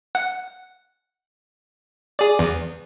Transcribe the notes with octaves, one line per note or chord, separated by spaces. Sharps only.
F#5
G#4 D5
E2